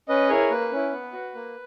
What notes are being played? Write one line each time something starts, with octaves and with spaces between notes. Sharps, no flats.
C#4 B4 D#5
E4 G#4 A#4 C#5
A#3 B4
C#4 E4
B3
F#4
A#3